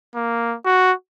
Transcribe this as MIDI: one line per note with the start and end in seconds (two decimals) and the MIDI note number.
0.15 0.56 58
0.65 0.92 66